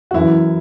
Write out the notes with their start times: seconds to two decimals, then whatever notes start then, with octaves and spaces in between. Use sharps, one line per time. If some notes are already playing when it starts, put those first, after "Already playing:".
0.11 F#4
0.14 F#2 E3 E4